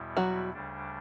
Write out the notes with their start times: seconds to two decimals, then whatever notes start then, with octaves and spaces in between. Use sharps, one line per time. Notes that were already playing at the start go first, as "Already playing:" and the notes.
Already playing: E2 B2 G3 B3 E4
0.17 F#3 F#4
0.53 D2 C#3 G3 D4